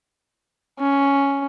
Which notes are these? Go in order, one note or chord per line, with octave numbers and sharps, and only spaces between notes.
C#4